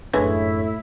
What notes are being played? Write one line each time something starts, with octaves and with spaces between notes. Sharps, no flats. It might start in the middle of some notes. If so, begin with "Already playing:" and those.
F#2 A2 D3 E3 G#3 E4 C#5